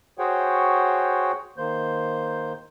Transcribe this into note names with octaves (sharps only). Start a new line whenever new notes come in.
F#4 G#4 C5 C#5 F#5 G5
D#3 A#3 C5 G6